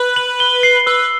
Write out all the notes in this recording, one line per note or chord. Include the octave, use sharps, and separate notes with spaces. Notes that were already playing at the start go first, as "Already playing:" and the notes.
Already playing: B4 F#6
F#7
G7
C7
B4 E6